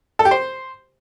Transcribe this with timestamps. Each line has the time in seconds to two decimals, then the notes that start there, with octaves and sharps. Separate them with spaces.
0.19 A4
0.25 G4
0.31 C5